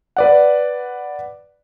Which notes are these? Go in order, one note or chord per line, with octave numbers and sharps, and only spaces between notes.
B4 D5 F#5